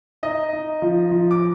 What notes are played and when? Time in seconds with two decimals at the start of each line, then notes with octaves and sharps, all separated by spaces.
0.23 D#4 D#5
0.53 D#4
0.82 F3
1.11 F3
1.31 D6